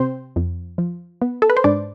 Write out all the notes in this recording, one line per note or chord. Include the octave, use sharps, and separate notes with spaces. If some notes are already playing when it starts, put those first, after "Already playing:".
Already playing: C3 C4 C5
F2
F3
B3
A4
B4
C5
G#2 D4 D5